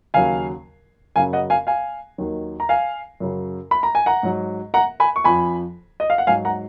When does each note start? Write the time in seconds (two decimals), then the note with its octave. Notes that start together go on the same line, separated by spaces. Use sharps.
0.14 D#2 C#3 F#3 F5 G#5
1.16 F#2 C#3 F#3 F5 G#5
1.33 D#5 F#5
1.50 F5 G#5
1.67 F5 G#5
2.18 D#2 D#3 F#3
2.60 A#5
2.69 F5 G#5
3.20 F#2 C#3 F#3
3.71 B5
3.83 A#5
3.95 G#5
4.06 F#5 A#5
4.23 G#2 F#3
4.74 F#5 A#5
5.00 G#5 B5
5.16 C#6
5.24 F2 F3 G#5 B5
6.00 D#5
6.10 F5
6.18 F#5
6.27 G#2 F#3 F5 G#5
6.45 F#5 A#5